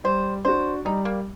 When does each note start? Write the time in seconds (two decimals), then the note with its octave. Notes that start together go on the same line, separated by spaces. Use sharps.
0.04 G3 C5
0.45 D4 F#4 C5
0.85 G3 D#4
1.05 A#3